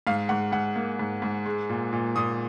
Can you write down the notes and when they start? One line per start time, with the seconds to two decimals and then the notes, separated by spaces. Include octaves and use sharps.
0.07 G#2 F5
0.29 G#2 F#5
0.52 G#2 F#5
0.76 A#3
0.99 G#2
1.22 G#2
1.46 G#3
1.69 A#2
1.93 A#2
2.16 A#2 D#6